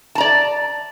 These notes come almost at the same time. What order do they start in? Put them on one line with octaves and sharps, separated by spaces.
A5 A#5 D5